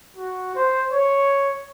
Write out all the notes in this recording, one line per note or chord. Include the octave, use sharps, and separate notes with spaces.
F#4
C5
C#5